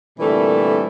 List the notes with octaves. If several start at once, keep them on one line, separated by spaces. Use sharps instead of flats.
A#2 D3 E3 G3 A3 C4